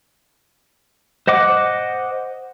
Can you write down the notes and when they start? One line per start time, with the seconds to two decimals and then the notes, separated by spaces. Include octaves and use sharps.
1.27 C5 D#5 F#5 D6